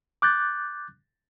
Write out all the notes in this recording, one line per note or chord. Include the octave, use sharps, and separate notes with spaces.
D6 F#6 G6 A6